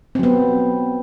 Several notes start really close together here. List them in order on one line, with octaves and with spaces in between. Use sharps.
C4 F#3 B3